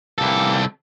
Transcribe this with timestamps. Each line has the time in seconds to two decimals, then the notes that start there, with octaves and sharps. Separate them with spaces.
0.18 C2 E3 A#3 G4 A4